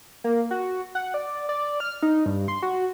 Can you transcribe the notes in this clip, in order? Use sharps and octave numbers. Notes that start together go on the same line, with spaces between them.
A#3
F#4
F#5
D5
D5
F6
D#4
G2
C6
F#4